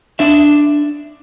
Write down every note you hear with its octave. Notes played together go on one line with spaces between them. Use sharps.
D4 E5